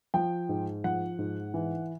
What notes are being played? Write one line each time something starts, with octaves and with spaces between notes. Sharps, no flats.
F3 G5
G#2
F3 F#5
G#2
E3